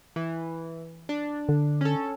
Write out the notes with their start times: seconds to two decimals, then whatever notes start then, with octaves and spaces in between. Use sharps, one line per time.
0.16 E3
1.09 D4
1.49 D3
1.81 C#4 A4